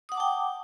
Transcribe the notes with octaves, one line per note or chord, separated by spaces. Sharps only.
F#5 G5 A5 D6 D#6